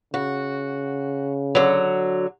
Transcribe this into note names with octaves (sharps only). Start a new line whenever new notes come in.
C#3 F#4
D3 F#3